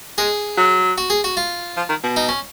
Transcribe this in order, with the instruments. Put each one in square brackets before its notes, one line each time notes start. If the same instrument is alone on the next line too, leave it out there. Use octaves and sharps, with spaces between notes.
[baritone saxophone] G#3 [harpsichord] G#4
[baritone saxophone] F#3
[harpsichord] F#4
G#4
F#4
F4
[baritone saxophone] F3
D#3
B2
[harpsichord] D#4
C#4